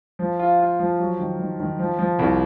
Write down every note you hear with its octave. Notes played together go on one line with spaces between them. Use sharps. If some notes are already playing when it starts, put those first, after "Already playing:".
F3
F4
F4
F3
F#3
D#3
D#3
D#3
F3
F3
C2